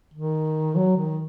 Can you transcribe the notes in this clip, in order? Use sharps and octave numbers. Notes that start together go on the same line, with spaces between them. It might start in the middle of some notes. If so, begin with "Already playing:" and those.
D#3
F#3
D#3